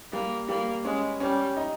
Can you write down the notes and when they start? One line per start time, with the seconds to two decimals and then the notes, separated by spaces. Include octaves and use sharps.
0.12 G3 A#3
0.49 G3 A#3
0.85 G#3 C#4
1.20 G3 C#4
1.57 D#4